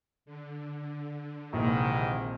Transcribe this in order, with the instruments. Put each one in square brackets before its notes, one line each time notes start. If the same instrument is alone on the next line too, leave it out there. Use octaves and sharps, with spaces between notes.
[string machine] D3
[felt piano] A#1 [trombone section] G#2 D#3 E3 [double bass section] C3